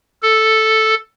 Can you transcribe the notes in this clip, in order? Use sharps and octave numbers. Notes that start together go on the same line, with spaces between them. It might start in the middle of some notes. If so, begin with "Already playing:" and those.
A4